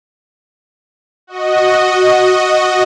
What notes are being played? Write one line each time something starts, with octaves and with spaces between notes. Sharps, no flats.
F#4 D#5